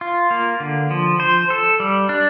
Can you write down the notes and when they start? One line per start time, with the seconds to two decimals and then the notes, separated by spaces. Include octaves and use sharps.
0.01 F4
0.31 A#3
0.60 D3
0.91 F3
1.20 C5
1.50 A4
1.80 G3
2.09 D4